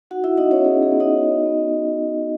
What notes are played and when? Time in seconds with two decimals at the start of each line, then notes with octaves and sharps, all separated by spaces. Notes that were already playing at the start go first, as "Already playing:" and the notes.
0.11 D#4 F#4 F#5
0.24 E4 E5
0.37 B3 D#4 D#5
0.51 C#4 C#5
0.64 F#4 G#4
0.82 G#4
0.91 B3
1.00 D#4 D#5
1.18 F#4
1.45 B3